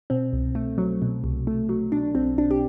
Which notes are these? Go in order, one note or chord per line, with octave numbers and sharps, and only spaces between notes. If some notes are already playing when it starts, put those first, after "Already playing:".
B2 C4
C2
A3
F#3
B2
C2
A3
F#3
B2 D4
B1 C4
B1 D4
G4